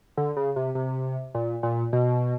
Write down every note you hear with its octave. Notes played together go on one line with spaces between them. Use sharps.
D3
C#3
C3
C3
A#2
A#2
B2